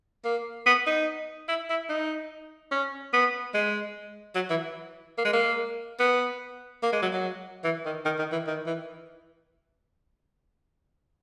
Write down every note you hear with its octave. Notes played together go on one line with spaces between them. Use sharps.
A#3
B3
D#4
E4
E4
D#4
C#4
B3
G#3
F#3
E3
A#3
G#3
A#3
B3
A#3
G#3
F#3
F#3
E3
D#3
D#3
D#3
E3
D#3
E3